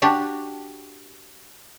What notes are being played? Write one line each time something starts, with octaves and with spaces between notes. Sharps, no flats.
D4 F#4 G4